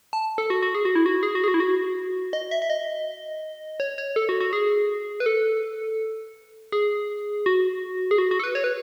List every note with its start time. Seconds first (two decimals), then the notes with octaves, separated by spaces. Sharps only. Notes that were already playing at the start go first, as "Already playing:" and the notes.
0.13 A5
0.38 A4
0.50 F#4
0.62 F#4
0.75 G#4
0.85 F#4
0.95 E4
1.06 F#4
1.23 G#4
1.35 F#4
1.44 G#4
1.48 F#4
1.54 E4
1.60 F#4
2.33 D#5
2.51 E5
2.62 E5
2.70 D#5
3.80 C#5
3.98 C#5
4.16 A4
4.29 F#4
4.40 F#4
4.53 G#4
5.20 B4
5.26 A4
6.72 G#4
7.46 F#4
8.11 G#4
8.18 F#4
8.31 F#4
8.39 A4
8.44 B4
8.55 C#5
8.64 B4